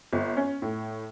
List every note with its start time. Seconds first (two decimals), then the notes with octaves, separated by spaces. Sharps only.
0.13 G1
0.37 C#4
0.62 A2